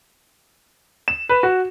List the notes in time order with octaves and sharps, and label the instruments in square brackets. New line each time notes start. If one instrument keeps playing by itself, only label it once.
[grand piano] E7
B4
F#4